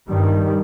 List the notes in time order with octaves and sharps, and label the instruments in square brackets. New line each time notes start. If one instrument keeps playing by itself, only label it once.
[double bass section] G2 D#3 G3